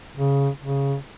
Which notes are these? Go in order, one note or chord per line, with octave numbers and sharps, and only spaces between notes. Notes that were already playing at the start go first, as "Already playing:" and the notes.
C#3
C#3